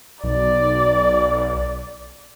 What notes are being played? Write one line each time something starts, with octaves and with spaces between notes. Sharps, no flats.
B1 D5